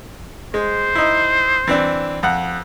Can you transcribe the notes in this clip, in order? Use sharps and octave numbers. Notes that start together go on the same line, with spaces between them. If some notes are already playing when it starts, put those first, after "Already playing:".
G#3 C5
D#4 E4
E3 C4 D4
F2 F#5